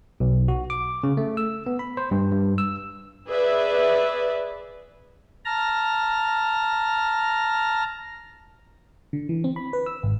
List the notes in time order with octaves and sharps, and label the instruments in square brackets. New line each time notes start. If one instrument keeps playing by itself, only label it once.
[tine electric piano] B1
F#4
D6
C#3
A3
E6
B3
B5
C5
G2
G2
E6
[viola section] G#4 B4 D5 E5
[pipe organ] A5 A#5 F6 A#6
[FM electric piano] D3
E3
C4
B5
B4
E6
G#1